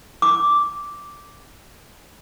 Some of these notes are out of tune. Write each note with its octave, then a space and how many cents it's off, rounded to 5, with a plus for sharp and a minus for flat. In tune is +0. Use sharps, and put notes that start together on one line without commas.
D6 -5